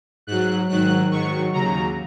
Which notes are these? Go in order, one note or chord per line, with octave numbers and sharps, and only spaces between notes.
G#2 F#3 F#6
G#2 D#3 F#3 F#6
G#2 D#3 F#3 C#6
D#2 C#3 F#3 A#5